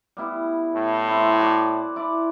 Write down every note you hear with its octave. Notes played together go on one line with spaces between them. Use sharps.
G3 B3 E4
A2
C4 E4
F#4 A4 D5
E4 D5